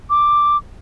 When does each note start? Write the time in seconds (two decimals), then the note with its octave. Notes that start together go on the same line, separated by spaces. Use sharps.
0.10 D6